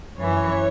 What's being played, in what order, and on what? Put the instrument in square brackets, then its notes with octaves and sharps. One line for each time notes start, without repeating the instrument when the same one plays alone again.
[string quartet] F#2 E3 C#5